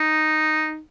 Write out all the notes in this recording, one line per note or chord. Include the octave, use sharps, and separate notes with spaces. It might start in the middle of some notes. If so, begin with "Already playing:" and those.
Already playing: D#4